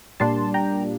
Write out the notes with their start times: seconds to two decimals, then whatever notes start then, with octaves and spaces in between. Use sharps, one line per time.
0.20 A#2 G3 A#3 D4 A5 C6
0.54 G5 A#5